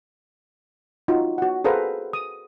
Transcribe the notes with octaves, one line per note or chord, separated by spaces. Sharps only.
D#4 F4 F#4
F#4 F#5
G#4 A4 B4 C5 F5 A#5
D#6